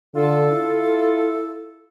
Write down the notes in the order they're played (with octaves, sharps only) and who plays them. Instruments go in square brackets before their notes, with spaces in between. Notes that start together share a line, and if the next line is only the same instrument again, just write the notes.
[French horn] D3 [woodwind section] F4 A4
[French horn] E4